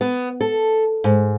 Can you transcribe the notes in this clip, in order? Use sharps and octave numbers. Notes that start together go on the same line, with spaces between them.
B3
A4
G#2